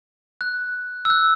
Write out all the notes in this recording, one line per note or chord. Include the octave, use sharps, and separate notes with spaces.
F#6
E6
F#6